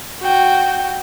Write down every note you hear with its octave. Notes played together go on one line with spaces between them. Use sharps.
F#4 G5